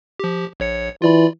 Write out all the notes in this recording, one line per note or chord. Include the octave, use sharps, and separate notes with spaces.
F3 G4
A#1 C#5 C#7
E3 F4 D5 B5